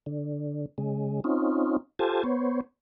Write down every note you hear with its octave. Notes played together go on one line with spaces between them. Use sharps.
D3
C#3 G#3
C4 C#4 D#4 F4
F4 G4 A4 C5 G#5 A5
B3 C5 C#5